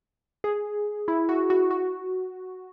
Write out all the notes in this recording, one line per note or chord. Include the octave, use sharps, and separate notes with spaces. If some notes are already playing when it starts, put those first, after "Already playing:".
G#4
E4
F#4
F#4
F#4